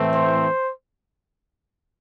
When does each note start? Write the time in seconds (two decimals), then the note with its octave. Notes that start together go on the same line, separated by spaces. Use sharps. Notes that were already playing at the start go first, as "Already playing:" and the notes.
Already playing: A2 E3 A3 C4
0.15 C5